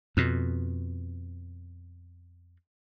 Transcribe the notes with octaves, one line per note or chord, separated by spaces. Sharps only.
F2 B2